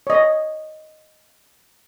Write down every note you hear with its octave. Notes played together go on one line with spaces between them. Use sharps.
C#5 D#5